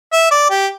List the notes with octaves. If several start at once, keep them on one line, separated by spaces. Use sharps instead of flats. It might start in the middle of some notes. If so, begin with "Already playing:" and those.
E5
D5
G4